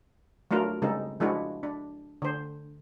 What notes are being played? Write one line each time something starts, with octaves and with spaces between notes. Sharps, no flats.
F#3 A3 D4 F4 A#4
C#3 G3 G#3 C4 D#4 A4
F3 G#3 D4 E4 F#4
D4
D3 C5